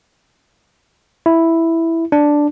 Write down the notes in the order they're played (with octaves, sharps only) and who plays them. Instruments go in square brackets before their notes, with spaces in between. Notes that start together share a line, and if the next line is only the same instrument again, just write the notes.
[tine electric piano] E4
D4